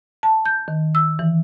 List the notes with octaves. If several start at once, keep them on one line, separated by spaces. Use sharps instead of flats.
A5
G6
D#3
E6
E3